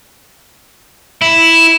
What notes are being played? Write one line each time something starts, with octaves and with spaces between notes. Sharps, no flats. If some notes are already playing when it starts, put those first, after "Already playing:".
E4